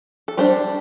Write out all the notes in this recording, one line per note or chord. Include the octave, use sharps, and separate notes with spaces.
A4
G3 D4 C5